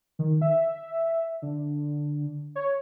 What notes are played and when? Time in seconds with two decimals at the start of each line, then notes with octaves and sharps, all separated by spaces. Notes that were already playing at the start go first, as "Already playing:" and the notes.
0.19 D#3
0.42 E5
1.42 D3
2.55 C#5